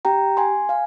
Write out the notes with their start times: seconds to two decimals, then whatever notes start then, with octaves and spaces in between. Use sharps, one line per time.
0.05 C#4 G4 G5 A#5
0.37 G#5 C6
0.69 F5 G#5